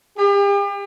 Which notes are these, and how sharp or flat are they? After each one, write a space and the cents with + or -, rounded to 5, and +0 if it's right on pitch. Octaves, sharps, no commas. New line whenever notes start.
G4 +40